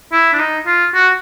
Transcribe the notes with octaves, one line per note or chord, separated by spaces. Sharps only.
E4
D4
D#4
F4
F#4